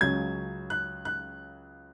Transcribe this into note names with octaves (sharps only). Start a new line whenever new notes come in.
C#2 C#3 F#3 C#4 G#6
F#6
F#6